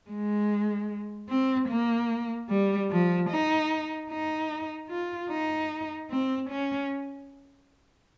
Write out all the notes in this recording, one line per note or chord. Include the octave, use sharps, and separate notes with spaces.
G#3
C4
A#3
G3
F3
D#4
D#4
F4
D#4
C4
C#4